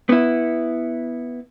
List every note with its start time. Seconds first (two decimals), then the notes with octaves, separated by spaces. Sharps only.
0.09 B3 E4